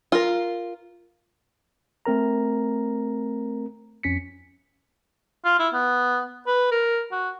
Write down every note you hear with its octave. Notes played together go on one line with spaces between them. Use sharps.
F4 A#4
A3 C4 A#4 A#5
F2 C#4 B6 C#7
F4
E4
B3
B4
A#4
F#4